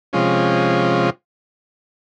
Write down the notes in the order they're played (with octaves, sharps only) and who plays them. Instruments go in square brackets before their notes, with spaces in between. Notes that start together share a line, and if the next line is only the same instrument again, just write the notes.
[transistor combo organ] C3 F3 G#3 C#4 F4